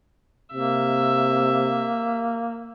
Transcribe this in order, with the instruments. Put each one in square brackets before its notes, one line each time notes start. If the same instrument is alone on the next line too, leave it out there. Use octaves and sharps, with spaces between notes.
[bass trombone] C3 [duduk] A#3 [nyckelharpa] E5